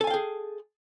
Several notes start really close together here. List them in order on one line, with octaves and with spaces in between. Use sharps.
A4 G#5 F5 G5 G#4